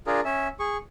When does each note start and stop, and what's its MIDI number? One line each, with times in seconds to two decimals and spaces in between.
0.07 0.20 62
0.07 0.20 65
0.07 0.20 68
0.07 0.20 70
0.25 0.48 61
0.25 0.48 76
0.59 0.77 68
0.59 0.77 85